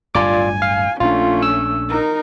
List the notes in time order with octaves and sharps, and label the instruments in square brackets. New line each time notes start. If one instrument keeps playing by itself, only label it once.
[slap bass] D1 G1 G2 [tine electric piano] F4 D5 D6 [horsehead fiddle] G#5
[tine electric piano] F5
[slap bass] A#1 D4 [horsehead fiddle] A3 C#4 [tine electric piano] F4
[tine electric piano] E6
[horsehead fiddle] D#4 A#4